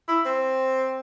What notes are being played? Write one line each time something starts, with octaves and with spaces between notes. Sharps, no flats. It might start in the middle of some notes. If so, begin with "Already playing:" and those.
E4
C4